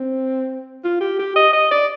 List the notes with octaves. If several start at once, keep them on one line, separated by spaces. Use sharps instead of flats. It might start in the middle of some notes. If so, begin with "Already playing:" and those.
Already playing: C4
F4
G4
G4
D#5
D#5
D5